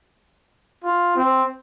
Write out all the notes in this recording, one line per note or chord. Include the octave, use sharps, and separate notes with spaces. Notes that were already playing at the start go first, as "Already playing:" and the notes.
F4
C4